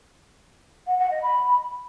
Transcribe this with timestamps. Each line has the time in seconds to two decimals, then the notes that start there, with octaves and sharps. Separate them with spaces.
0.87 F#5
0.99 F#5
1.11 D#5
1.22 B5